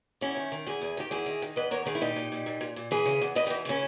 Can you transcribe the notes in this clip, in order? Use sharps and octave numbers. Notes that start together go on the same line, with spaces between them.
E2 C#4 E4
D#3
D#3
E2 E4 G#4
E2
D#3 G4
E2 E4 G#4
D#3
D#3
E2 B4 D#5
E2 A#4 C#5
D#3 G#4 B4
E4
A#2 D#4 G4
A#2
A#2
A#2
A#2
A#2
E3 G#4 B4
C#3
E2
E2 B4 D#5
D#4 G4
E3
C#3 C#4 E4